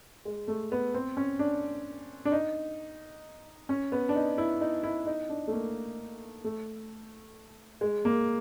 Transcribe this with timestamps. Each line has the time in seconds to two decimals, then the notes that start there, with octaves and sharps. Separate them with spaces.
0.25 G#3
0.48 A3
0.72 B3
0.94 C4
1.17 C#4
1.39 D4
2.25 D4
2.32 D#4
3.69 C#4
3.92 B3
4.09 D4
4.15 D#4
4.38 E4
4.61 D#4
4.83 E4
5.07 D#4
5.29 D4
5.47 A3
5.52 A#3
6.44 A3
7.81 G#3
8.05 A#3